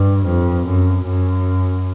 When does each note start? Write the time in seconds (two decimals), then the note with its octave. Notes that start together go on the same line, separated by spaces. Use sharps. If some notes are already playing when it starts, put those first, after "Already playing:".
Already playing: G2
0.26 F2
0.65 F#2
1.05 F#2